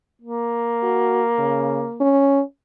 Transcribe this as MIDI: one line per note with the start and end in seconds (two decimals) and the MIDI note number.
0.21 2.04 58
0.83 1.23 66
1.39 1.85 49
2.00 2.42 61